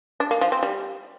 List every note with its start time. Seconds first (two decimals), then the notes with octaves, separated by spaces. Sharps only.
0.20 D4
0.31 A#3
0.41 F3
0.52 C4
0.63 G3